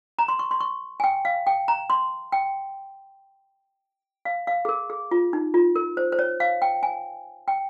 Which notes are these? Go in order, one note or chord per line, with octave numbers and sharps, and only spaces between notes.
A#5
C6
C#6
C6
C#6
G#5
G5
F5
G5
A#5
C6
G5
F5
F5
G#4
A#4
G#4
F4
D#4
F4
A#4
C5
C5
C#5
F5
G5
G#5
G5